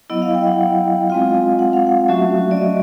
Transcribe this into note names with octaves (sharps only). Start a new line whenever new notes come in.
F#3 B3 E4 D#5
F5
G5
F#5
G#3 C4 F4 F5
F#5
F5
F#5
F#3 A3 C#4 F#4 E5
D5
D#5